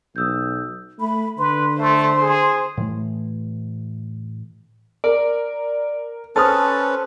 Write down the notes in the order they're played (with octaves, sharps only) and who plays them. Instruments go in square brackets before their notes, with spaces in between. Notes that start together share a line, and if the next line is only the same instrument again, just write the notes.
[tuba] B1 [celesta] D#6 E6 G6
[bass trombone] A3 [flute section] B5
[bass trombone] D3 [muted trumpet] B4 [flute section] C6
[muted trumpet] A3 [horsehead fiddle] C5
[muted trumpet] G#4
[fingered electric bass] A2 E3 A3
[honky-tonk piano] A#4 [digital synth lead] D5
[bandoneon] C#4 B4 [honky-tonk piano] A4 C5 F6 [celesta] A5 D#6 [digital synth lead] A6